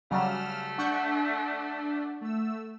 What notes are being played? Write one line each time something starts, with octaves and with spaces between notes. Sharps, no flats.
C#3 F#3 G3 A3 F6 E7
D4 F#5 C#6 G6
A3 E6